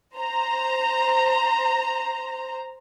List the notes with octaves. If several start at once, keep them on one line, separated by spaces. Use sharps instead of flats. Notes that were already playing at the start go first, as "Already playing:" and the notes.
C5 A#5